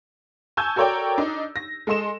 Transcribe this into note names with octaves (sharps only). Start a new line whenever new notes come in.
G#5 A5 C#6 E6 G6 G#6
F#4 A4 A#4 C#5 D5 G5
D4 D#4
A#6
G#3 A4 D#5 C6 E7